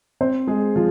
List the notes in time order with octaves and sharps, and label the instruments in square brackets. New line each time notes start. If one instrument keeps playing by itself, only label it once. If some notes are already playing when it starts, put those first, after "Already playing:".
[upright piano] C4 C5
G#3 G#4
F3 F4